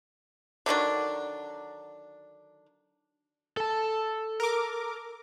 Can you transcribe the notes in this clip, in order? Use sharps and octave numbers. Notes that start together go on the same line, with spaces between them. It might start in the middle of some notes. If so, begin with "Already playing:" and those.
D3 D#3 F#3 D4
A4 A5
A#4 D6